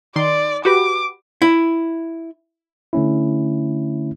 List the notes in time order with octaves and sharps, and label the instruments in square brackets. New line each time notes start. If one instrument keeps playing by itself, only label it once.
[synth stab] D#3 C6 [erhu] D5
[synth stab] F#4 G4 B4 [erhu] D6
[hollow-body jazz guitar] E4
[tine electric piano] D3 A3 C#4 E4